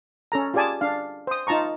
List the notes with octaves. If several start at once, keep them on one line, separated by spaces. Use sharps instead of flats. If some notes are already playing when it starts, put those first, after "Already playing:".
C#4 A4 A#5
F4 G4 G#4 D5 G#5 A5
D4 F5
C5 D#6
D#4 F4 A5 A#5 C#6